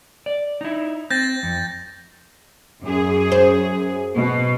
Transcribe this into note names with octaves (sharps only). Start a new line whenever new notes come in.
D5
D#4 E4
C4 G6 A6 A#6
F2
F#2 G#4
C5
B2